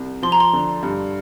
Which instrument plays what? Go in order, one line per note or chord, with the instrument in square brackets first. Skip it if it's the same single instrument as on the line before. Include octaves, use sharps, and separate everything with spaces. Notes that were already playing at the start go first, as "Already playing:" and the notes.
Already playing: [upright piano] C2
[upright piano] F3 [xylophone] C6
[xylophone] A#5
C6
[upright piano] D3
G2